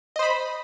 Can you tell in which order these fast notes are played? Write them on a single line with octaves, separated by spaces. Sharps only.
D#5 C5 B5